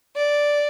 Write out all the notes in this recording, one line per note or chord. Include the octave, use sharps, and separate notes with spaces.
D5